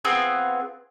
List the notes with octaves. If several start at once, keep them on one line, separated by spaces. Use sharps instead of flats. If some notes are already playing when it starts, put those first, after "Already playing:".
B3 C4 F4 G#4